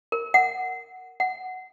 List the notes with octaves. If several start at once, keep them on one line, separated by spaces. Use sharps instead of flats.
A#4
F#5
F#5